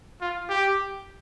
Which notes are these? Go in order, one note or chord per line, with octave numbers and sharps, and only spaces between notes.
F4
G4